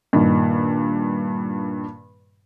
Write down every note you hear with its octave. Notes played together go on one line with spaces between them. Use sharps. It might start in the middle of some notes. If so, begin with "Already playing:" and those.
G2 A#2 D#3